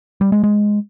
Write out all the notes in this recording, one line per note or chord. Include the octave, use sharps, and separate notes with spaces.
G3
G#3
G#3